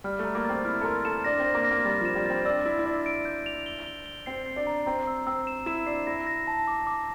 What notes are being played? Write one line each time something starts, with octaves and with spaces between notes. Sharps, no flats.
G3 F6
A3
A#5
A#3
C4 A6
E4 F6
A4
A#4 C6
A4 E7
D4 A#6
C4 A#6
A#3
A#6
A#3
G3 A6
F3 E7
G3
C4 A6
D4 E6
E4 E6
E4
D4 E6
D7
G6
F7
G7
G7
G7
C4 C7
C7
D4
A#5
C4 A#5
E6
C4 E6
E7
E4 E7
D4 C7
E4 A#6
A#6
A5
D6
D6